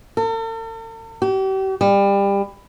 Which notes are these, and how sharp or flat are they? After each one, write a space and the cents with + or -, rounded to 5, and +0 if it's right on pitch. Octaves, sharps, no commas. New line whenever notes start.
A4 +45
G4 -40
G3 +25